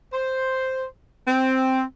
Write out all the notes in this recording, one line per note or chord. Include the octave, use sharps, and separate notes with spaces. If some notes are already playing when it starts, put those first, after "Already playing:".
C5
C4